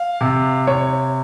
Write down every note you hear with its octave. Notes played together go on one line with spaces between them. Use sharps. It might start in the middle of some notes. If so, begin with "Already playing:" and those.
Already playing: F5
C3
C3 C#5